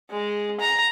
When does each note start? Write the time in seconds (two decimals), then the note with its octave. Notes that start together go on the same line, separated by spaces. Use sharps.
0.10 G#3
0.60 A#5